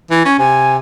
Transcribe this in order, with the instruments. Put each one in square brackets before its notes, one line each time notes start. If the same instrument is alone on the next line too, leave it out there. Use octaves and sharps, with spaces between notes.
[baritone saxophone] E3
C#4
[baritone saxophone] C3 [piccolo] G#5